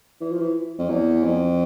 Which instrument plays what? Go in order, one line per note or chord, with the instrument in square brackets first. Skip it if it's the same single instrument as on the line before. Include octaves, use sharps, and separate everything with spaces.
[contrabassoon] E3
F3
E3
F2
E2
F2